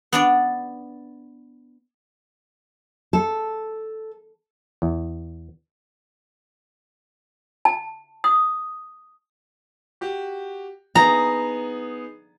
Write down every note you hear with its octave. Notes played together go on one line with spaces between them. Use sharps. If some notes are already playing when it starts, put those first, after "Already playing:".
B3 D4 D5
A4
E2
A5
D#6
F#4 G4
B3 D#4 G#4 A#5